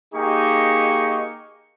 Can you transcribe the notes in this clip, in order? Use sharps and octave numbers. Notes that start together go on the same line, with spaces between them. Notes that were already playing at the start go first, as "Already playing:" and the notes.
A#3 D#4 G4 G#4 D#5 C#6